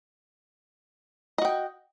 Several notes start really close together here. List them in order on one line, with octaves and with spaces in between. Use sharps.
D#5 F#4 G5